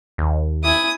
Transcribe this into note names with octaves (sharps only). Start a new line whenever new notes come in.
D#2
E4 G#5 D#6